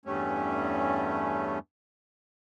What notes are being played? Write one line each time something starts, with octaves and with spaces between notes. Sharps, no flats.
E2 G2 G3 A3 C#4